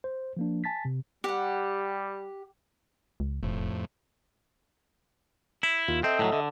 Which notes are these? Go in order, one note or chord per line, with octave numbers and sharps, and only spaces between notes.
C5
F3 A#3 D4
G#5 A5 A6 B6
C3
G3 G4 F#5
C#2
E1 F2 A2
E4
D#2 F4
C4 A4 D#5 E5
A2 E3 F#3
D3